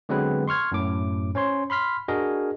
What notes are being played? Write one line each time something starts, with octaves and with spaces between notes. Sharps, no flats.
D3 F#3 G#3 B3 C4 B4
C6 C#6 F6 G#6
F#2 A2 D6
C#4 C5 C#5 C6
B5 C6 F6 B6
D4 F#4 G#4 A#4 D#5